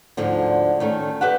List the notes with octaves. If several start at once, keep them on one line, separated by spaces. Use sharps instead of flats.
D2 G#2 D3 F3
D#3 A3 C#4
G4 B4 E5 F#5